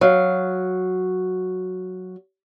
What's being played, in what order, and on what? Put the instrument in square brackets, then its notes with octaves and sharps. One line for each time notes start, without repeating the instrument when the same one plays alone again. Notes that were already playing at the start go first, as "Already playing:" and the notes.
[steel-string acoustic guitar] F#3 F5